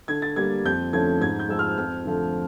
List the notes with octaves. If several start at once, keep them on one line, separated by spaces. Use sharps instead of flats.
D3 G#6
A6
G3 A#3 G#6
F2 G6
D3 F3 A3 C#4 G#6
G#2 G#6
G6
F3 G#3 E6
F6
F2 F6
D3 F3 A3